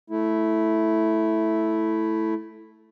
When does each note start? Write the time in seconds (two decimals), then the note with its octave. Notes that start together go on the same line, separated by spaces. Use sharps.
0.10 A3 E4